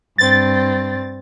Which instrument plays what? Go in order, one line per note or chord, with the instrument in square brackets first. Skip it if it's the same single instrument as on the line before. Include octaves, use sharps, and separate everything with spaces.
[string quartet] G2 C4 [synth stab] A6